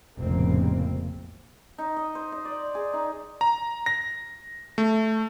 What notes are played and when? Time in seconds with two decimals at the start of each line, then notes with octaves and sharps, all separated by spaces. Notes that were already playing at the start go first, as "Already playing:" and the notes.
0.16 F1 A#1 A2 C#3 A#3 C4
1.78 D#4
1.96 D#5
2.15 C5
2.32 D#5
2.45 D5
2.75 G#4
2.93 D#4
3.41 A#5
3.86 A#6
4.78 A3